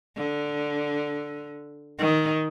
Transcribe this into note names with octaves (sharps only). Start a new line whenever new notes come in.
D3
D#3